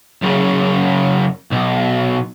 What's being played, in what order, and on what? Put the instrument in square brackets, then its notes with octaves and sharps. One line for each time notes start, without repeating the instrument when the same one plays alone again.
[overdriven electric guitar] F#2 C#3
B1